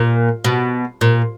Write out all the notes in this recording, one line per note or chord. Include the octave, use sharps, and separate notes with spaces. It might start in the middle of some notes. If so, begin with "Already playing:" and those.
Already playing: A#2
B2
A#2